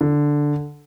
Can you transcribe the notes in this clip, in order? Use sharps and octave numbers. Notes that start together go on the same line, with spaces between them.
D3